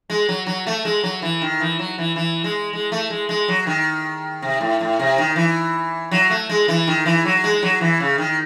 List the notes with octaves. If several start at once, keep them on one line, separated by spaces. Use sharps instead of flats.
G#3
F#3
F#3
A3
G#3
F#3
E3
D#3
E3
F#3
E3
E3
G#3
G#3
A3
G#3
G#3
F#3
D#3
C3
A2
A2
C3
D#3
E3
F#3
A3
G#3
E3
D#3
E3
F#3
G#3
F#3
E3
C#3
D#3